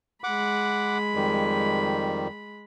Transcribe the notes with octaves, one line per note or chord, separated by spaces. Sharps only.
G#3 F#5 B5 D6
F2 D#3 G3